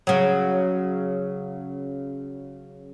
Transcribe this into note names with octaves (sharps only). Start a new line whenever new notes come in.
C#3 F#3